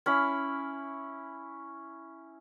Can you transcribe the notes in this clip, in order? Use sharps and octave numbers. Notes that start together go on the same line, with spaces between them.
C#4 E4 B5